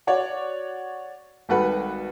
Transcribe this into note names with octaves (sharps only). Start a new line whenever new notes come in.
F#4 C#5 D5 F#5
G#1 G3 F#4 A4 B4